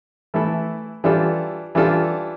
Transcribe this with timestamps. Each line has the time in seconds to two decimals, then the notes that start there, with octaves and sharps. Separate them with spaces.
0.34 E3 A3 E4 A4
1.04 E3 G3 D4 F4 A4
1.75 E3 G3 D4 F4 A4